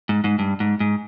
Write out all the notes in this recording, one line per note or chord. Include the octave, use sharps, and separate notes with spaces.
G#2
G#2
G2
G#2
G#2